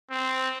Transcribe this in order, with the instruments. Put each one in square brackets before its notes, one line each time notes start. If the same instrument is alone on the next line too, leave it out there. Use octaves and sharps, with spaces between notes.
[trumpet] C4